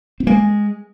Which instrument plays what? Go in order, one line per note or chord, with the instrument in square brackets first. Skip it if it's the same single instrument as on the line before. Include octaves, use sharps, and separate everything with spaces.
[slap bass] C4
[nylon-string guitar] G#3 [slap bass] A#3